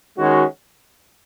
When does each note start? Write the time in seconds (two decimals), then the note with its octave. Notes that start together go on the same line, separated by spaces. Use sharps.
0.18 D#3 G#3 C#4 F#4